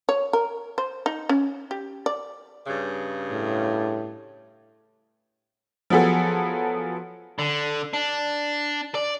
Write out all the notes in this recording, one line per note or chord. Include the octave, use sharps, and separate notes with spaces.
C#5
A#4
C5
D#4
C#4
G4
D5
G2 C#3
A2
F3 F#3 B3 G#4 A4
D3
D4
D5